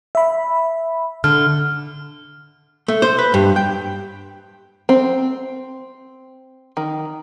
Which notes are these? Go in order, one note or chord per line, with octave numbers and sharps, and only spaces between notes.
E5 B5
D3 F6
A3
C5
B4
G2
G5
C4
D#3